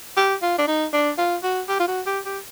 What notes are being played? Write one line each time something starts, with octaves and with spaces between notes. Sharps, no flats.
G4
F4
D4
D#4
D4
F4
F#4
G4
F4
F#4
G4
G4